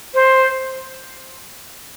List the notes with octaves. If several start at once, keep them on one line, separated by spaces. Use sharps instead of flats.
C5